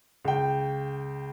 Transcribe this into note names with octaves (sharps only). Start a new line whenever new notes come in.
C#2 G5